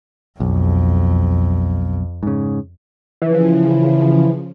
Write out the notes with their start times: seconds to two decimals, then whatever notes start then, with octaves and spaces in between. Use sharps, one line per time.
0.40 B1 F2
2.23 G#2 C#3
3.22 C#3 E3 F3